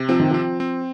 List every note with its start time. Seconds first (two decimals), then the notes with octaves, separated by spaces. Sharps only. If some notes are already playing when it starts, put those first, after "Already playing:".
Already playing: C3
0.09 F3 C4
0.20 D#3
0.31 F3 C4
0.60 C4